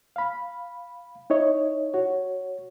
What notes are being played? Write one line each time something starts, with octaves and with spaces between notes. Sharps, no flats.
F5 B5
D#4 E4 C#5 D#5
F#4 C#5